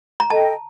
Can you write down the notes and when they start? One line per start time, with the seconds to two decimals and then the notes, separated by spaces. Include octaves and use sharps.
0.20 A#5
0.30 A4 D#5 G5 A5